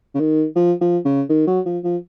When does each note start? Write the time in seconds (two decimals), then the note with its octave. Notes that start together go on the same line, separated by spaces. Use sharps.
0.14 C#3
0.19 D#3
0.55 F3
0.81 F3
1.05 C#3
1.29 D#3
1.47 F#3
1.66 F3
1.84 F3